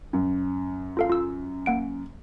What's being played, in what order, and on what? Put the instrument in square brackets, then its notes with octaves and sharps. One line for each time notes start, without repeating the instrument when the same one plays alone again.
[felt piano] F#2
[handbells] F4 A4 F5
F4 E6
A#3 F#5 D7